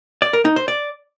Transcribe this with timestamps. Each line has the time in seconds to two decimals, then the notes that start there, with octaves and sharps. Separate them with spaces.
0.22 D5
0.33 A#4
0.45 D#4
0.56 C5
0.68 D5